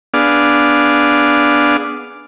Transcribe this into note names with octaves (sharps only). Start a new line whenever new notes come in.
B3 D4 G#4 D5 F5